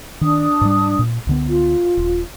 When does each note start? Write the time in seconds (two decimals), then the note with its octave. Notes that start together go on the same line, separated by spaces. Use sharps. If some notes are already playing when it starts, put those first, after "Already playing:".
0.21 D#3 D4 D#6
0.61 G#2 G3
0.99 A#2
1.27 C#2 D3 B3
1.48 F4
1.97 D#1